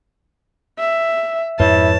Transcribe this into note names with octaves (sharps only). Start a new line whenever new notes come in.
E5
F2 G#2 E4 B4 C#5 A5